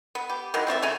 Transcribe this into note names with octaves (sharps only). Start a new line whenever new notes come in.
B3
G4
D#3 E3 F#3 G#3
C4 F4 C#5 E5
C#3 A3 C#5 G#5